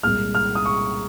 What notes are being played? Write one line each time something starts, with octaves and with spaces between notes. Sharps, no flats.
C2 A#2 G#3 F6
F6
D#6
C#6